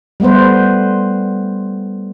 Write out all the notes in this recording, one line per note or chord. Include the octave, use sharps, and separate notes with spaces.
G3 A3 B3 B4 C5